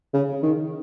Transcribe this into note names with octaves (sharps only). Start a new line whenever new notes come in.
C#3
D#3